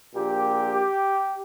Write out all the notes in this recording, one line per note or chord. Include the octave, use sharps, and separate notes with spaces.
A#1 A#2 G4